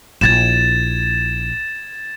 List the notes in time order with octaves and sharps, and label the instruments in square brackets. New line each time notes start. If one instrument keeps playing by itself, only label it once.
[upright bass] A#1 E4 [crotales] G#6 A6 E7